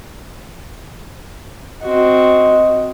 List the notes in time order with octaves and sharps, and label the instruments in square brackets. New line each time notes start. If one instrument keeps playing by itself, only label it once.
[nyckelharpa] C4 F#4 [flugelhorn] D#5